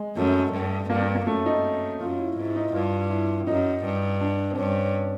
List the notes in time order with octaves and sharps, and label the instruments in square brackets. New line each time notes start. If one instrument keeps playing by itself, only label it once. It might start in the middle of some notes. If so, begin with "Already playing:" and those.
Already playing: [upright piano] G#3
[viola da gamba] F#2 [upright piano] A3
[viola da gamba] G2
[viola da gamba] G2 [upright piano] A#3
[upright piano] A#3
A#3
[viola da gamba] F#2 [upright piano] A3
[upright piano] D#4
[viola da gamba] F#2 [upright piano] F4
[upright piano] E4
[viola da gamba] G#2 [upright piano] E4
[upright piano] D#4
[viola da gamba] G2 [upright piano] F4
[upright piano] E4
[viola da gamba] F#2 [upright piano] D#4
[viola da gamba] G2
[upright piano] D4
C4
[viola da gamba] G2 [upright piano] C#4